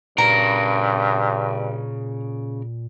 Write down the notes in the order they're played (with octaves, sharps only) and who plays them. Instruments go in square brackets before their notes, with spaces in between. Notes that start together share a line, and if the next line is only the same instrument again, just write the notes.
[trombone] G2 [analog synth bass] A#2 [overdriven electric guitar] C#3 A#4 [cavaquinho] A#5